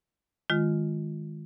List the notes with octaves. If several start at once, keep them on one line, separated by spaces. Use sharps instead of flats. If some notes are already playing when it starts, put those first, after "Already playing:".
D#3 G#3 F4